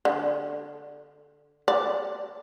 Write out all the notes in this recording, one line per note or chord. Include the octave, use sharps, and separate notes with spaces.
D3
D5